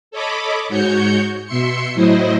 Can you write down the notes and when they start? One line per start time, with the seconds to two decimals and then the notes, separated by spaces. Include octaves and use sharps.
0.11 A4 C#5 D#5 B5 D6
0.69 G#2 F#4 C#5 G6 C#7
1.46 B2 E5 C6 C#7
1.95 A2 F#3 E4 C5 D#5